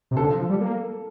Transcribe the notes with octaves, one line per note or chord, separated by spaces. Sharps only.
C3
D3 A4
F3
F3
G3
A#3